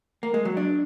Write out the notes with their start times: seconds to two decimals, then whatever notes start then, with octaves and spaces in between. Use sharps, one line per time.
0.23 A#3
0.34 G#3
0.45 F#3
0.57 D4